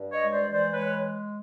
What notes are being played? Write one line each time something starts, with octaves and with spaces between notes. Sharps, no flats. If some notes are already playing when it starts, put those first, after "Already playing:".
Already playing: G2
C#5 D#5
G#3
C5 D5
E3
C5 D5
G#3 B4 C#5